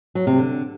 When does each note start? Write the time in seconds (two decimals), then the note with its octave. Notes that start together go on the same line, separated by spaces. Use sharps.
0.15 F#3
0.27 C3
0.38 D3